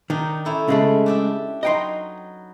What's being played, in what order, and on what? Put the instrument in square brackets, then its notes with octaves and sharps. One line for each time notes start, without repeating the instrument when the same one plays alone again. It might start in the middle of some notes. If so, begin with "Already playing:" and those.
[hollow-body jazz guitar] D#3 [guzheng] D4 D#4
[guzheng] C#4 E4 A4
[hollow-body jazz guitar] C#3 G#3 A3
[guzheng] D4 G4 E5
[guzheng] F#3 D#4 B4 [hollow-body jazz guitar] D#5 G5 C6